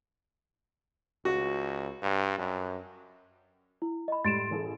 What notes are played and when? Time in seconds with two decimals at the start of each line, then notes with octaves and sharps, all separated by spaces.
1.25 C#2 F#4
2.03 G2
2.38 F#2
3.82 E4
4.08 D#5 B5
4.25 A2 G3 C6 A6 D7 E7
4.51 A1 G#4 A4